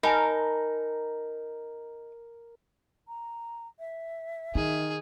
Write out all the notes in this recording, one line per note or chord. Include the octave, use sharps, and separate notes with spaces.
D#4 A#4 G#5 A5 B5
A#5
E5
D#3 D#4 G#4